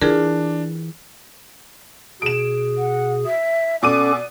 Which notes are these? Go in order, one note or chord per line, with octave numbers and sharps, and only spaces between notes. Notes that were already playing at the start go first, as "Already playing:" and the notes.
E3 D4 F4 G#4 A#4
B2 G#4 D7 E7
F#5
E5
B2 C#4 A4 D5 D6 D#7